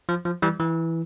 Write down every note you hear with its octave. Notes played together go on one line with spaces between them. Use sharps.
F3
F3
E3 G3
E3